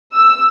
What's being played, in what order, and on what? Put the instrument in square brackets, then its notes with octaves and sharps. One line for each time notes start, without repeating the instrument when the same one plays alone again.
[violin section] E6